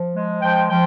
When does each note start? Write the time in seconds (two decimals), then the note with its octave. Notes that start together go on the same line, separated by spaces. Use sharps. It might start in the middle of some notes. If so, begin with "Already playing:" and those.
Already playing: F3
0.14 G#3
0.42 F3 G5
0.70 F3 G5